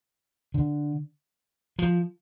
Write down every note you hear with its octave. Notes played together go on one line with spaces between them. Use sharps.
D3
F3